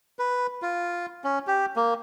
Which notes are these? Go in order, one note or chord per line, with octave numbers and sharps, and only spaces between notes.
B4
F4
C#4
G4
A#3